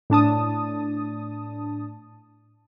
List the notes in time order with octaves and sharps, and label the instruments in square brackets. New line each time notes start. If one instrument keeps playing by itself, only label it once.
[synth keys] A2 D4 A5 D#6